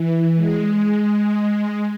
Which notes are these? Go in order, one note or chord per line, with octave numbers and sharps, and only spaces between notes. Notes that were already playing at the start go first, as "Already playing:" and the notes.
Already playing: E3
G#3